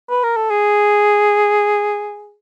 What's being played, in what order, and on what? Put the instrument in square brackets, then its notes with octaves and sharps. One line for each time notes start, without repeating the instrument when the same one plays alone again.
[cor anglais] B4
A#4
A4
G#4